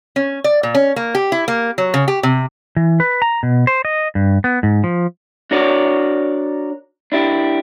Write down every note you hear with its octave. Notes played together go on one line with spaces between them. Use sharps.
C#4
D5
A#2
C#4
A#3
G4
E4
A#3
F#3
C#3
G4
C3
E3
B4
A#5
B2
C5
D#5
G2
B3
G#2
F3
D4 F#4 A#4 C#5 D5
D4 E4 G4